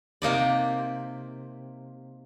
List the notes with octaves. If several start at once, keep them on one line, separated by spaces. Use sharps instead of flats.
C3 A#3 D#4 D5